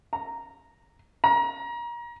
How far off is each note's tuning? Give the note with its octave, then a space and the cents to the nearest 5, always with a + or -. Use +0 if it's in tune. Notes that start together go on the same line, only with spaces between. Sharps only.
A#5 -5
A#5 +30